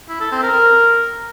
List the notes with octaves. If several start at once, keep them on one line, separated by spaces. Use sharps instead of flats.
E4
A4
C4
A#4